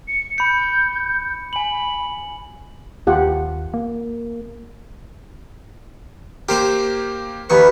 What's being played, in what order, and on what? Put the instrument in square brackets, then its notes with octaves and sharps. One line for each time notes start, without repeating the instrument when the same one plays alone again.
[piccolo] C#7
[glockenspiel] B5 C#7 [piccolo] G6
[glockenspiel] G#5 F#7 [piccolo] B5
[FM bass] D#2 [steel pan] F4 G4 F#5
[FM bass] A#3
[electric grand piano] A#3 G4 [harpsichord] A#4 C5 D6
[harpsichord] D#2 D#3 C#6 [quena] B4